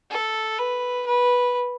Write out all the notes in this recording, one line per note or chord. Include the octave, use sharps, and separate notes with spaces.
A4
B4
B4